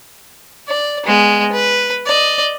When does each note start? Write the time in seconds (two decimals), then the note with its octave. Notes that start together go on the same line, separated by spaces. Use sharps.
0.69 D5
1.06 G#3 B3
1.52 B4
2.06 D5 D#5